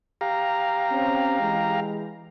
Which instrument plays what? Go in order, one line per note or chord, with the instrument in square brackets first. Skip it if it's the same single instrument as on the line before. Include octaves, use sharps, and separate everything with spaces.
[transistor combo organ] G4 F5 A#5
[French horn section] C4 C#4
E3 G#3